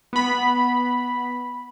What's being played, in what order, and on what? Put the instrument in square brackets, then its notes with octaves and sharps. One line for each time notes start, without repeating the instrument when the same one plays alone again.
[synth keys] B3 B5